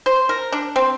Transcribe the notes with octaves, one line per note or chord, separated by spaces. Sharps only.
C5
A#4
D4
C4